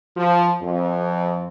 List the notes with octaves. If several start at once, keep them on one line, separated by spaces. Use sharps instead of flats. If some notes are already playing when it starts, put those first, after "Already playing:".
F3
F2